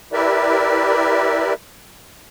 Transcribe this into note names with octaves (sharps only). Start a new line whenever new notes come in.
E4 G4 A#4 B4 D5 E5